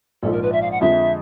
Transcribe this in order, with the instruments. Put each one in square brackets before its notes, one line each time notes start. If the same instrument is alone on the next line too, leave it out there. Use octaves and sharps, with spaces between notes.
[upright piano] A#1 G#2 F3 [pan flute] A4
[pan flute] A#4
B4
E5
F5
F#5
[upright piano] F2 D3 F3 G#3 [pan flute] E5